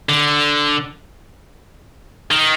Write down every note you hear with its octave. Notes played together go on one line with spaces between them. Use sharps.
D3
D#3